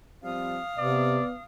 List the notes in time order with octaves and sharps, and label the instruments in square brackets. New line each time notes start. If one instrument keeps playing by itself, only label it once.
[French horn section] F3 G3 C4 [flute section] F5 D#6
[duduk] C3 [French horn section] B3 [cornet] D5